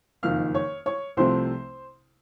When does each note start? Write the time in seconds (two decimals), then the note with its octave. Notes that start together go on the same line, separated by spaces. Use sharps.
0.23 F#1 F2 D#3 F5 F6
0.54 C#5 C#6
0.86 C#5 C#6
1.17 C2 C3 F3 A3 C4 C5 C6